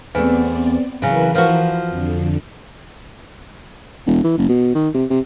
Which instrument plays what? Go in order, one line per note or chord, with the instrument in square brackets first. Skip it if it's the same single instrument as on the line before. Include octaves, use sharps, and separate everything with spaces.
[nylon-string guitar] E2 A3 [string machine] B3 C4 D5
[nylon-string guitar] C#3 F#3 [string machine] E3 A#4 B4
[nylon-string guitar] F3 F4 F#4
[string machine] F2 D3
[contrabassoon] E1
E3
F#1
B2
D#3
C3
C3